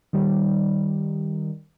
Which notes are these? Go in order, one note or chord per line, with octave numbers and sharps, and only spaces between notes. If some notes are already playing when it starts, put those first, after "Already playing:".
D#3 G3